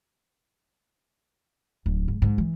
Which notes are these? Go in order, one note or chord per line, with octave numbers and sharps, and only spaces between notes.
D1
G#2
G#2
E3